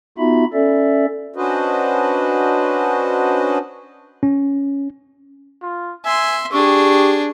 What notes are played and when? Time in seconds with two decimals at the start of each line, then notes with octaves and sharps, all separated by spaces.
0.18 B3 D#4 F4 F#4 E5 B5
0.54 C#4 A4 D5 E5
1.36 C#4 D4 F#4 B4 C5 D#5
4.23 C#4
5.62 F4
6.05 E5 G#5 C6
6.52 D4 G4 G#4 C#6